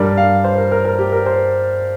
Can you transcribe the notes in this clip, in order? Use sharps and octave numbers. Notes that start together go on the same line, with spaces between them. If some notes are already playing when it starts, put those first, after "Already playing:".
Already playing: G2 G3 D4 A#4
F5
C5
A#4
A#4
A#4
G4
A#4
C5